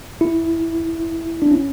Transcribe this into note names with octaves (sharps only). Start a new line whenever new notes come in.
E4
D4
C#4